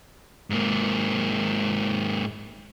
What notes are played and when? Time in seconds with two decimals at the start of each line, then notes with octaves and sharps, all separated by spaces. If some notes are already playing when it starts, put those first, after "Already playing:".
0.50 G#2 A#3